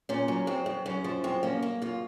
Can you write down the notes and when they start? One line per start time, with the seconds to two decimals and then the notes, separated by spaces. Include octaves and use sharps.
0.09 A#2 C#4
0.28 F#3
0.47 F#2 C4
0.66 F#2
0.86 F#2 C#4
1.04 F3
1.24 F#2 C4
1.43 A#3 C#4
1.62 A#3
1.82 F#2 F4